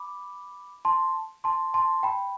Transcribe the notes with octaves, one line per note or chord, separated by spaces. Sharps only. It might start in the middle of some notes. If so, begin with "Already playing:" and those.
Already playing: B5 D6
A5 C6
A5 C6
A5 C6
G5 B5